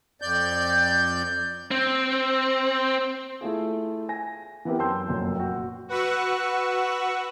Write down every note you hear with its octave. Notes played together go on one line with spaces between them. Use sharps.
F2 D5 G6
C4
A3 E4 F4 G#4
G#5 A#6
E3 B3 C4 G4 A#4
F#2 G5 A5 C6 E6 G6
F1 F#2 A#2
F#4 G5
F#4 B4 F#5 C#6 E6 F#6